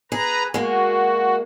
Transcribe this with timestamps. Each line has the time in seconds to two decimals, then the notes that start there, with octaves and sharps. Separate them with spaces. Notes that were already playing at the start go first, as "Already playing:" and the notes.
0.12 G#4 B4 A#5
0.54 G#3 A#3 F#4